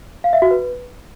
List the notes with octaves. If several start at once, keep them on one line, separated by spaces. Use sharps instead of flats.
F5
E5
F#4
B4